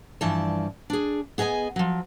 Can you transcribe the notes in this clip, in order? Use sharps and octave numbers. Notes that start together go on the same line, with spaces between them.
G2 E3 F3 D5 A5
D4 G#4
B3 G#4 D#5 E5 G#5
F3 F#3